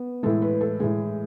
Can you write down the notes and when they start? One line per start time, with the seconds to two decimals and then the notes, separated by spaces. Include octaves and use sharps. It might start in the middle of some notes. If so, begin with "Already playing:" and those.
Already playing: B3
0.23 A2 E3 G#3 A4
0.42 B4
0.61 A4
0.80 A2 E3 G#3 G#4